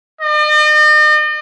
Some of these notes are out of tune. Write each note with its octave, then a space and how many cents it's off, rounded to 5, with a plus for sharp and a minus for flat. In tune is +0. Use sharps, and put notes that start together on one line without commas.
D#5 -45